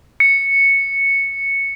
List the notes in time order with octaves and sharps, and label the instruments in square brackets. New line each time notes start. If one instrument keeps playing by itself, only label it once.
[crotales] C#7